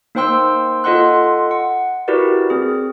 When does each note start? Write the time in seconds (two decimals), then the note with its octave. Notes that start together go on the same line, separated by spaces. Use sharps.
0.15 A#3 D#4 C5 G5 C6 E6
0.84 F4 A4 D#5 F#5 C6 F#6
1.51 F#5
2.08 E4 F#4 G4 A#4 B4 D5
2.50 C4 G#4